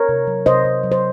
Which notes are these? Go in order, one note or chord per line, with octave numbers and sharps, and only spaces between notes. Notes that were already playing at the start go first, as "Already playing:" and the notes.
Already playing: A#4 C#5
C3
F#3
C3 C5 D#5
C3
F#3
C5